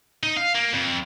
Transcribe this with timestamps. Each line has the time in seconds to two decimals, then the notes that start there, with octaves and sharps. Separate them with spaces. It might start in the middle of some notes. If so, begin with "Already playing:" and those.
0.23 D#4
0.37 F5
0.55 A#3
0.74 F2